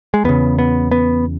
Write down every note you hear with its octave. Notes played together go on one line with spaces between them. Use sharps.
G#3
E2 C#3 B3
B3
B3